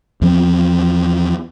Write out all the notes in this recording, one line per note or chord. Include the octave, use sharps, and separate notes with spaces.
E2 F3 C4